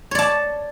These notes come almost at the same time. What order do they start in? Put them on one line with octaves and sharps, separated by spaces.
C#5 D5 A5